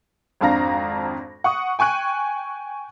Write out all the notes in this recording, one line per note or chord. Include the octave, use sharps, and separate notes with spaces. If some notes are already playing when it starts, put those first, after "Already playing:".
G#1 F2 D4 F5 A#5 A#6
F#5 C#6 D#6
G5 G#5 C#6 F#6 D#7